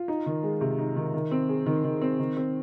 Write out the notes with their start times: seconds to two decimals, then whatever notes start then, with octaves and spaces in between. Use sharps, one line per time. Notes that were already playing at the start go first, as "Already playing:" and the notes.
Already playing: F4
0.08 D#4
0.26 D#3
0.43 G#3
0.61 C3
0.79 D#4
0.96 D#3
1.14 D#3
1.31 C4
1.49 G#4
1.66 D#3
1.84 D#3
2.01 C4
2.19 D#3
2.37 C4